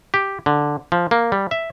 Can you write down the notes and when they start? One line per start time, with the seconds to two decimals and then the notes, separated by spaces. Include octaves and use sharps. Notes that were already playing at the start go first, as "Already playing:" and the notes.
0.14 G4
0.46 D3
0.92 F3
1.11 A#3
1.32 G3
1.51 E5